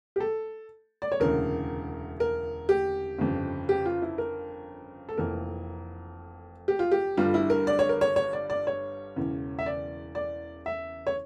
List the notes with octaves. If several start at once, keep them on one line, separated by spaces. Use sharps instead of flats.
G4
A4
D5
C#5
E1 D2 C#3 A#4
A#4
G4
G1 F2 C#3
G4
F4
E4
A#4
A4
F1 F2 E3 A#3 A#4
G4
F4
G4
G1 G2 D3 G3 F4
E4
A#4
D5
C#5
A#4
C#5
C#5
D5
D5
C#5
E1 E2 C#3
E5
D5
D5
E5
C#5